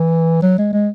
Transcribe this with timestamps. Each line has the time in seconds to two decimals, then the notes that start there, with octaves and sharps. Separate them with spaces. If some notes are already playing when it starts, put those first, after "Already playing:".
Already playing: E3
0.42 F#3
0.58 G#3
0.73 G#3